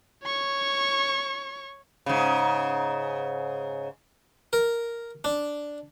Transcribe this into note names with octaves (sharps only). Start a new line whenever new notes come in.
C#5 C#6
G#2 C#3
A#4
D4